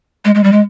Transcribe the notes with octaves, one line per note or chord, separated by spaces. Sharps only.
G#3
G#3
G3
G#3